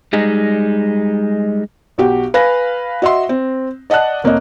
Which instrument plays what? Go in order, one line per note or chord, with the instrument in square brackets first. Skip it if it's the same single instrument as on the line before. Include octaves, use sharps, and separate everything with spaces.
[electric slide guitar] G3 G#3 D#4
[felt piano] B1 F#4 G4
B4 F5 G#5 A#6
F#4 D#5 E5 C6
C4
D5 D#5 F#5 A5 F#6
F1 A#3 C#5 D#5